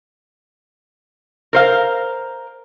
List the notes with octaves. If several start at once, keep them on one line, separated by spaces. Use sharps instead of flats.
A#4 C5 F5